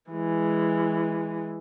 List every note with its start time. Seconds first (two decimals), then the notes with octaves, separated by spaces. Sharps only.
0.11 E3 G#3